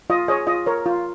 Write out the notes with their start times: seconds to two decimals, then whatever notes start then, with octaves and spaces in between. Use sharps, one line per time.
0.10 F4 D#5
0.28 G#4 C#5 D#5
0.47 F4 D#5
0.66 A#4 C#5
0.86 F4